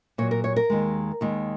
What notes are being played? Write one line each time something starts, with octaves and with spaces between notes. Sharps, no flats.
A#2 F#3 C#5
A#4
C#5
A#4
D#2 D#3 G#3
D#2 D#3 G#3